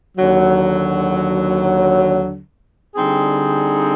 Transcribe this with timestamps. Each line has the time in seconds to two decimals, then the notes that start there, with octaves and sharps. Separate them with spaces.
0.18 D#2 D3 F#3
2.96 D3 G3 C4 D#4 G#4